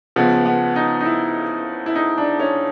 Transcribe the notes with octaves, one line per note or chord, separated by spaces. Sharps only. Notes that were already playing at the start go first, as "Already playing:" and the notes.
C#2 C#3 F3 B3
B3
D#4
D#4
E4
E4
D#4
D4
C#4